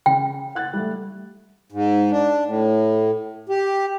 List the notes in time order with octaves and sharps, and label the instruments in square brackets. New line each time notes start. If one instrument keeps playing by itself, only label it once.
[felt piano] C#3 [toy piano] G5
[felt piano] F#5 F#6 A6
G3 A3
[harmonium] G#2
D4
A2
G4